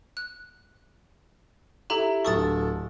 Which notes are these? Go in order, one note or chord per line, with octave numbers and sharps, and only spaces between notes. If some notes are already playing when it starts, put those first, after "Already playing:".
F#6
E4 G4 A4 A#5
D1 A4 C#6 D#6 A6